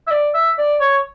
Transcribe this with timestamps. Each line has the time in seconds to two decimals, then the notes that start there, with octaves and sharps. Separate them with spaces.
0.07 E5
0.11 D5
0.34 E5
0.58 D5
0.80 C#5